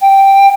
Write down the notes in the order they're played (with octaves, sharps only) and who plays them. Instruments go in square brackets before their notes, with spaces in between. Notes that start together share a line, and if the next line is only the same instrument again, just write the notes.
[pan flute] G5